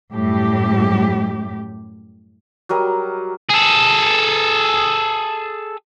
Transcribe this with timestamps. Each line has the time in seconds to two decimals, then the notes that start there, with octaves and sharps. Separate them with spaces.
0.14 F#2 A2 G3 G4
2.69 F#3 G3 A#4 D#5
3.49 G#4 A4